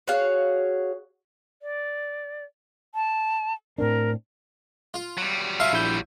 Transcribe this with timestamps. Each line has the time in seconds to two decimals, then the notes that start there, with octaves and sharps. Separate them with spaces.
0.08 F#4 G#4 C#5 F5
1.62 D5
2.95 A5
3.78 A2 C4 D4 A#4
4.94 F4
5.18 F#3 G3
5.60 F4 E5 F5 A5
5.72 A#1 E4 G6